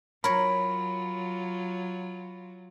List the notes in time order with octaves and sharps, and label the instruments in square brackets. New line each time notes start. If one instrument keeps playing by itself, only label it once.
[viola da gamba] F#3 F4 [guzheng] A#4 C#5 [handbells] B5